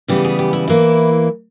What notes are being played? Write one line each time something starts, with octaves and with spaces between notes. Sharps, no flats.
C#3 E3 G3 B3 G4
G#4
G4
E4
E3 A#3 E4